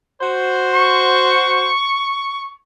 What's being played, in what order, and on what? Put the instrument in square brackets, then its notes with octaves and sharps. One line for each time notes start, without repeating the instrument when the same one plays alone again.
[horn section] F#4 C5
[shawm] C#6